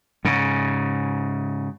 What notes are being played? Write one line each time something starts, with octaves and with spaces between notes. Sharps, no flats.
G#2 C#3